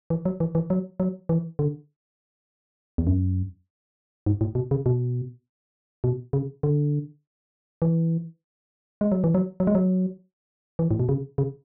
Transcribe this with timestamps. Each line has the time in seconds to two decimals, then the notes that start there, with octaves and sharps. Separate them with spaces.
0.10 E3
0.25 F#3
0.40 E3
0.55 E3
0.70 F#3
1.00 F#3
1.29 E3
1.59 D3
2.98 E2
3.07 F#2
4.26 G#2
4.41 A2
4.55 B2
4.71 C#3
4.86 B2
6.04 B2
6.33 C#3
6.63 D3
7.82 E3
9.01 G#3
9.12 F#3
9.24 E3
9.35 F#3
9.60 F#3
9.67 G#3
9.75 F#3
10.79 E3
10.91 A2
11.00 B2
11.09 C#3
11.38 C#3